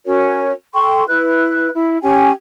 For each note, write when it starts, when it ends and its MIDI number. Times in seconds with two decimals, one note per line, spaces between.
0.06 0.52 61
0.06 0.52 66
0.06 0.52 70
0.06 0.52 73
0.74 1.03 69
0.74 1.03 79
0.74 1.03 84
0.74 1.03 85
1.08 1.69 64
1.08 1.69 71
1.08 1.69 90
1.74 1.98 64
2.03 2.30 61
2.03 2.30 67
2.03 2.30 79
2.03 2.30 80